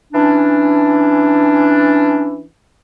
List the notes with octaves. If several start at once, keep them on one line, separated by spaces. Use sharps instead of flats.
E3 C#4 D4